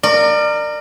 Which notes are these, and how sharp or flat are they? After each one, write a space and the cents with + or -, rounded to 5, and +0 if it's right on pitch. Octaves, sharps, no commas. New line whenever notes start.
A#4 -15 D5 +30